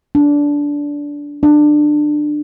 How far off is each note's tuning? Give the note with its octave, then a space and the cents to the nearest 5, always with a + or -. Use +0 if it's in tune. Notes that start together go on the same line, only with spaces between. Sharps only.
D4 -15
D4 +20